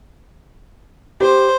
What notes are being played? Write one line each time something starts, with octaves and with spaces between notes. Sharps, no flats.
G4 C5